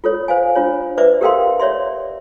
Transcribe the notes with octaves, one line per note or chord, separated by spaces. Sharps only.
F4 A4 C#5
C5 F5 G#5
D4 F4 C#5
B4 C5 D5 E5 D6
G4 A4 A#4 F5 G5 C6
C#5 D5 E5 C6